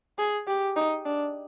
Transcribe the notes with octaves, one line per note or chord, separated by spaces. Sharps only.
G#4
G4
D#4
D4